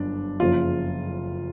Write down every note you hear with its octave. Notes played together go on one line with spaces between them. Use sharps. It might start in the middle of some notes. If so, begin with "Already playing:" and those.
Already playing: G1 F#2 D4
F#1 F2 C#3 F4